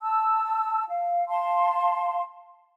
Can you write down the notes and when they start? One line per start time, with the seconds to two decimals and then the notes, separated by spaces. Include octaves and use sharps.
0.01 A5 E6
0.89 F5
1.29 F5 A5 C6